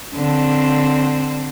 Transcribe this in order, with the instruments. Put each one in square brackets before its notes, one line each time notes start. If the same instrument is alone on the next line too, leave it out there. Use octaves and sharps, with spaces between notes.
[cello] D3 C4